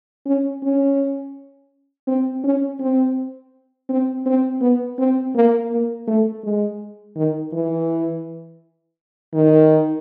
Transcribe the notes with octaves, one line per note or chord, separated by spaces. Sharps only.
C#4
C#4
C4
C#4
C4
C4
C4
B3
C4
A#3
A#3
A3
G#3
D#3
E3
D#3